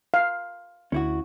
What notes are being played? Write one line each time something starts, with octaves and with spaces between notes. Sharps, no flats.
F5
D2 C#4 E4 F#4